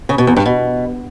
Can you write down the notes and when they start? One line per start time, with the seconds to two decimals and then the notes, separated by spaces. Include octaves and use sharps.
0.09 C#3
0.18 B2
0.27 E2
0.36 G2
0.46 B2